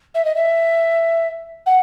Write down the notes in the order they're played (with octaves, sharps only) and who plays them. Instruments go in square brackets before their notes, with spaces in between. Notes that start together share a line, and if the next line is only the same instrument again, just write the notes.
[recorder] E5
D#5
E5
F#5